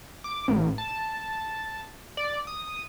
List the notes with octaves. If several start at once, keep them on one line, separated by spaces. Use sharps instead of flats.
D6
A1
A5
D5
D#6